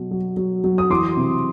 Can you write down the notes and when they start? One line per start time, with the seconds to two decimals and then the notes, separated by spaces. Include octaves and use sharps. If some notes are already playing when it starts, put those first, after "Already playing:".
Already playing: B2 F#3
0.11 F#3
0.37 F#3
0.64 F#3
0.78 D#6
0.90 E3 C6 D6
1.17 C3